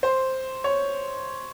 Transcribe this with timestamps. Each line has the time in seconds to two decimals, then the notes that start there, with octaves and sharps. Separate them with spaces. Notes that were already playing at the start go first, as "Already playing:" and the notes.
0.03 C5
0.64 C#5